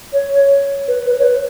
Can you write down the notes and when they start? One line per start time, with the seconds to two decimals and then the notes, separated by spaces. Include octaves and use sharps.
0.12 C#5
0.87 B4
1.05 B4
1.19 C#5
1.23 B4